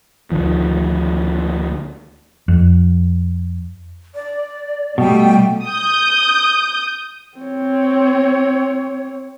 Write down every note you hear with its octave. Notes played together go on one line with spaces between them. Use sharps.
D2 D3 D#3 F3
F2
D5
B2 G3 A3 G5
D#6 G6
C4 C#5